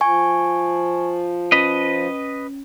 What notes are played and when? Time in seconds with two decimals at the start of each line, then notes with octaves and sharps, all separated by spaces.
0.01 F3 G#5 C#6
1.52 C#4 B4 D#5